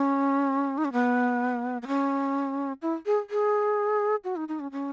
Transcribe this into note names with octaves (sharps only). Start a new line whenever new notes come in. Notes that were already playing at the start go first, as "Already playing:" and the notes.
Already playing: C#4
D#4
C#4
B3
B3
C#4
E4
G#4
G#4
F#4
D#4
D#4
C#4
C#4